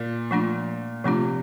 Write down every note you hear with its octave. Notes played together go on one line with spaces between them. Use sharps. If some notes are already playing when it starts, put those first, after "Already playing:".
Already playing: A#2
F3 A3 D4 F4
C3 F3 A3 D4 F4